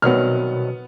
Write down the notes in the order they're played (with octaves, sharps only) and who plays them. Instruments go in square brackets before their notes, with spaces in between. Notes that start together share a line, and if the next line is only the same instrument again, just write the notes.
[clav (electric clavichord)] C2 D#3 F#3 [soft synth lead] B2 [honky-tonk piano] B3 F6